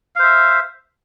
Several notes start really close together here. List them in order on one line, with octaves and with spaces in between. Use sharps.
F5 C5 E5